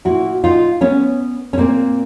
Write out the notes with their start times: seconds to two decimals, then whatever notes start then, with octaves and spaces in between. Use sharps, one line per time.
0.05 A#2 E4 F#4
0.44 D#4 F4
0.81 B3 C#4
1.53 C#4
1.57 A#2 A#3 C4